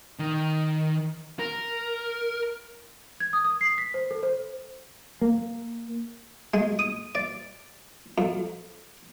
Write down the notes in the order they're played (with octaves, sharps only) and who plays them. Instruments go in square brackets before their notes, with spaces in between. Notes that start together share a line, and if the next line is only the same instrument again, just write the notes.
[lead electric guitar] D#3
A#4
[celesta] G#6
D#6
D#6
C7
B6
C5
A4
C5
[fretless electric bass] A#3
[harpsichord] G#3
D#6
D5
F2